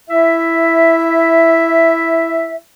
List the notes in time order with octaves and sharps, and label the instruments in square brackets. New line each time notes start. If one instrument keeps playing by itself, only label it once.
[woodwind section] E4 E5